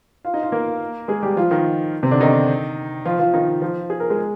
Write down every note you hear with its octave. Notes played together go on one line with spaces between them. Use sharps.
F4 F5
D#4 D#5
F4 F5
A#3 A#4
G#3 G#4
G3 G4
F3 F4
D#3 D#4
C3 C4
D3 D4
D#3 D#4
F3 F4
F3 F4
D#3 D#4
F3 F4
G#4
A#4
G#3 G#4